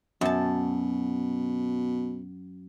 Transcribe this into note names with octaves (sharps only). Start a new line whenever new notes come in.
F#2 B2 A5